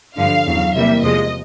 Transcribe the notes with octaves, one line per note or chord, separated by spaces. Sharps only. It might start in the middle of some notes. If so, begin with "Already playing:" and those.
G2 D3 F3 F5
E2 C#3 F#3
C3 E3 G3 A#3 E5
E2 C3 F3 G#3 D#5